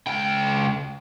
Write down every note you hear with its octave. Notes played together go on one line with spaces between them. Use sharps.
C#2 G5